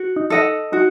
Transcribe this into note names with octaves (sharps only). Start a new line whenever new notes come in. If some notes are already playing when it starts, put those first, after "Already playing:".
Already playing: F#4
D#4
A4 D#5 F#5
D#4 F#4